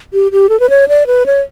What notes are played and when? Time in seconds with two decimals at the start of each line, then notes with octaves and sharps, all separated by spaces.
0.13 G4
0.32 G4
0.49 A4
0.60 B4
0.70 C#5
0.88 D5
1.07 B4
1.26 C#5